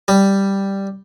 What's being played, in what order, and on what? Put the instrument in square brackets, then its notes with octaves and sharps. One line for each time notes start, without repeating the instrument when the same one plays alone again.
[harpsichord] G3